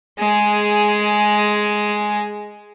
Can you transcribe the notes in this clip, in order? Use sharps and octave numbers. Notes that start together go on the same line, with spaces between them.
G#3 G#4